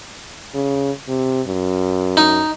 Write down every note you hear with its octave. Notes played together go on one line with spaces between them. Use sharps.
C#3
C3
F#2
D#4